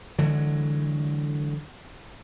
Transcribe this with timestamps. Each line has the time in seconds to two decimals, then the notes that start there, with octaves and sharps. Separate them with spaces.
0.18 D3 E3 F#3 G#3